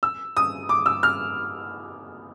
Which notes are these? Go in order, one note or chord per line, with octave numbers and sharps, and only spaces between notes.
E6
D#6
D6
E6
F6